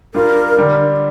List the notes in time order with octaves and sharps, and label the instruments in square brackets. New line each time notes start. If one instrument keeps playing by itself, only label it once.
[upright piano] G3 D4 F4 [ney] A#4
[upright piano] D3 G3 D4